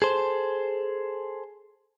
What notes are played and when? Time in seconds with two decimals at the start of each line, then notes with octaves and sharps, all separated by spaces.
0.02 G#4 A4 C5